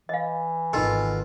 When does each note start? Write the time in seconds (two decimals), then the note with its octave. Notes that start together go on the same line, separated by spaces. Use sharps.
0.09 E3 D#5 F5
0.73 G#1 B2 D#3 F4 A4